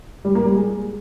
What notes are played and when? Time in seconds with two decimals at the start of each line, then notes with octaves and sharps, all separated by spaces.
0.25 G3
0.35 A#3
0.45 G3
0.56 G#3